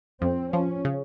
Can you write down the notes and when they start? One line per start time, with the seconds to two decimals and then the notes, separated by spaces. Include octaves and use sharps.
0.22 F2 C4
0.53 F3 C#4
0.85 C#3